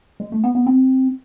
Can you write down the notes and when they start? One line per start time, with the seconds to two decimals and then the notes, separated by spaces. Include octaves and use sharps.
0.20 G#3
0.32 A3
0.44 B3
0.55 B3
0.67 C4